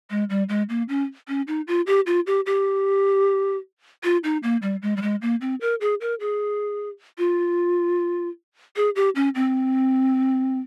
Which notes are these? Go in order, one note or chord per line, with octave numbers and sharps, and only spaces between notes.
G#3
G3
G#3
A#3
C#4
C#4
D#4
F4
G4
F4
G4
G4
F4
D#4
A#3
G3
G#3
G3
G#3
A#3
C4
A#4
G#4
A#4
G#4
F4
G#4
G4
C#4
C4